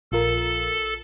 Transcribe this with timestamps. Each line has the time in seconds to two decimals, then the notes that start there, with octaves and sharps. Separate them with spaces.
0.12 A#1 F4 A4 A#4